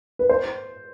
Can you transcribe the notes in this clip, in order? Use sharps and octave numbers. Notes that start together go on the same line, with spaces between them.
B4
C5